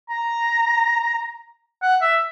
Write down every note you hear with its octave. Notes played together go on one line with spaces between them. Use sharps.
A#5
F#5
E5